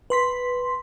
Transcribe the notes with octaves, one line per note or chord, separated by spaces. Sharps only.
B4 C6 B6